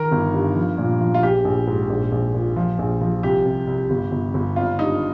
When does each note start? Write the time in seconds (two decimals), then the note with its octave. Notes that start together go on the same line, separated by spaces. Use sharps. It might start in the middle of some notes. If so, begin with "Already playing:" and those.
Already playing: D#3 A#4
0.12 G1
0.34 G2
0.56 F3
0.78 A#2
1.01 F3
1.14 F4
1.23 A#1 G4
1.45 A#1
1.67 G#2
1.89 A#1
2.12 A#1
2.34 A#2
2.56 F3
2.79 A#1
3.01 F3
3.23 C2 G4
3.45 C3
3.67 C2
3.90 G1
4.12 G1
4.34 G1
4.56 G#1 F4
4.79 G2 D#4